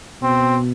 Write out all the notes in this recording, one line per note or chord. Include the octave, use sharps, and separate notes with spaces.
B2 C4